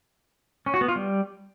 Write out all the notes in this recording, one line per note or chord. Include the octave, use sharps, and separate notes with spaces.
C#4
F#4
B3
F4
G3